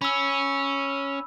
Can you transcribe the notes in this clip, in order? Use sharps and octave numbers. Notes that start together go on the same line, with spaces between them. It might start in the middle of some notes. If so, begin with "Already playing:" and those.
C#4 B5 E6